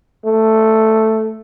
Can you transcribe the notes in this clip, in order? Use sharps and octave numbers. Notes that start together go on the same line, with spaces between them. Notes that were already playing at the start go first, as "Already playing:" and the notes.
A3